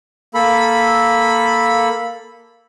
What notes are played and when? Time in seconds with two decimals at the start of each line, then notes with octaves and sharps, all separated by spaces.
0.34 A#3 A4 B5